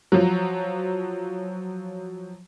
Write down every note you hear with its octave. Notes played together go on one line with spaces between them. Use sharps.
F3 F#3